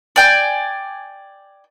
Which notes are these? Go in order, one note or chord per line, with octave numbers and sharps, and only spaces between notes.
D5 G5 G#5